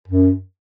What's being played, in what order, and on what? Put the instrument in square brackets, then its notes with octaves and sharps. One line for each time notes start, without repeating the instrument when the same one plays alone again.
[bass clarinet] F#2